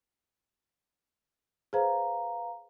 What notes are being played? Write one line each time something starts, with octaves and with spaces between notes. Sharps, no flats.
G#4 B4 C5 F5 A#5